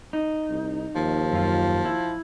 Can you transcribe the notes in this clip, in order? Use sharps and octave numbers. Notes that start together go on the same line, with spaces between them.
D#4
C2
D#2 F3
F#2 F4
E4